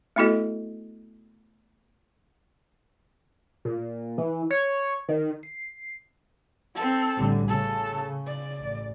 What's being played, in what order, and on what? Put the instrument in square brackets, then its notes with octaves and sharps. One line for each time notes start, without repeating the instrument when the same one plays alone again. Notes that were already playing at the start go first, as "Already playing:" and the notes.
[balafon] A3 B3 E4 F#4 A4 D#5
[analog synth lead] A#2
E3
C#5
D#3
C7
[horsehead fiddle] C4 A4
[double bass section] A1 D3 G3
[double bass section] C#3 [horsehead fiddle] A4
[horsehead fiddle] D5
[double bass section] A1